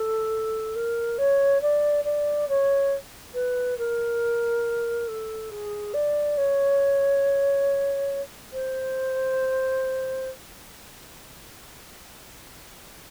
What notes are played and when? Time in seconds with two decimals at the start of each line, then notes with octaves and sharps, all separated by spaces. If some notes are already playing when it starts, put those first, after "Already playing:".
Already playing: A4
0.75 A#4
1.18 C#5
1.61 D5
2.04 D5
2.48 C#5
3.34 B4
3.78 A#4
5.07 A4
5.50 G#4
5.93 D5
6.37 C#5
8.53 C5